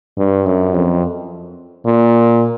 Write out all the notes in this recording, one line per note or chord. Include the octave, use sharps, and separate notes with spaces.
G2
F#2
F2
A#2